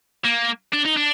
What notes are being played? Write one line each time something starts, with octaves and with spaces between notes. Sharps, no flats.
A#3
D4
D#4
D4